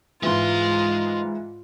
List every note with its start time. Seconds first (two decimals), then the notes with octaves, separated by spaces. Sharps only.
0.23 G#2 E3 G#3 F4 C6